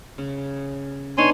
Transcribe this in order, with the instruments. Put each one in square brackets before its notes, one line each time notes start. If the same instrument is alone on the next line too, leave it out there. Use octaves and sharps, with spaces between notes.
[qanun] C#3
[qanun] B3 D4 D#4 [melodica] C#5 G#5 C6